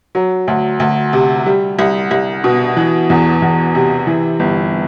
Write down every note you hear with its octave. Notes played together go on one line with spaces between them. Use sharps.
F#3
D2
D2
C3
G3
C2
C2
B2
E3
E2
E2
C3
E3
G1